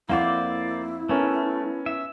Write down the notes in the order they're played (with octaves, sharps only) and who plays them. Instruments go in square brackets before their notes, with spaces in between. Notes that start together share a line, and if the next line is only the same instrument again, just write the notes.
[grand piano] F2 F5 F#5 [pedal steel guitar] A#3 C5 D5 [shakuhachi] E4
[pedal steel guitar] A3 [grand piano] B3 C#4 A#4
[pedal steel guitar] E5